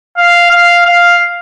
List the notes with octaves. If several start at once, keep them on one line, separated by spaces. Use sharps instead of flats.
F5
F5
F5